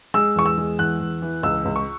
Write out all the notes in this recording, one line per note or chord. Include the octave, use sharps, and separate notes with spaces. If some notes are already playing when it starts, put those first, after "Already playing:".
G#3 E6
E2 C#6
E6
G#3
E2 F#6
E2
E3
C#2 E6
C#2
C#6